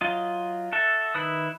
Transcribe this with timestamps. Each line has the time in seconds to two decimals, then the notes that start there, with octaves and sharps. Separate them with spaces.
0.01 F#3 F4 D#5
0.72 F#4 A4 E5
1.14 D#3 E4 B4 D#6